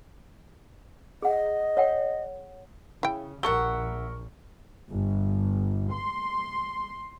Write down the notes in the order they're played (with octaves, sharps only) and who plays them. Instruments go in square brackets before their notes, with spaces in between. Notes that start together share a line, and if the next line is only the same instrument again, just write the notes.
[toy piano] G#4 F#5 [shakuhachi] D#5
[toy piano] C#5 F#5 G5
[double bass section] C#3 [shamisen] E4 G5
[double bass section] A#1 [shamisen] G3 A5 [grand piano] A#4 C#6 G7 [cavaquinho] E5 F#5
[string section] G1
C6